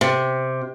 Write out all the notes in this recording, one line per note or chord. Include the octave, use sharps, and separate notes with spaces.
C3